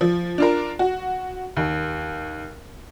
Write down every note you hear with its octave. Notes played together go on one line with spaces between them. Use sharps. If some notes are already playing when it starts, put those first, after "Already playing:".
F3
D4 F4 A#4
F#4
D#2